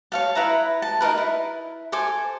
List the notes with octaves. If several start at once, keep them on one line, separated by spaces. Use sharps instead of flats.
C#5 F5 A5
E4 B4 E5 A#5
A5
D#4 F4 A#4 B4
E4
A4 C5 G#5 D6